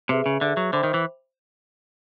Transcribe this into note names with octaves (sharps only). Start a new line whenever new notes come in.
C3 G#4 B4 E5
C#3
D3 G#4 B4 E5
F#3
D3 C5 E5 G5 B5 D6
D#3
E3